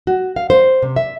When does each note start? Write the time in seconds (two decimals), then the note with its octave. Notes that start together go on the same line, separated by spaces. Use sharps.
0.07 F#4
0.36 F5
0.50 C5
0.82 C3
0.96 E5